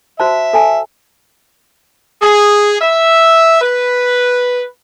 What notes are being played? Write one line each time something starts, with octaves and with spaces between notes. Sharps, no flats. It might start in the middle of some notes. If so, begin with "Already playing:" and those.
F#4 C5 E5 A5
A4 G#5 A5
G#4
E5
B4